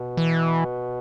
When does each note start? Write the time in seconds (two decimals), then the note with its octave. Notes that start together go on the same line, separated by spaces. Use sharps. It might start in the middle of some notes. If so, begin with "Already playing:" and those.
Already playing: B2
0.17 E3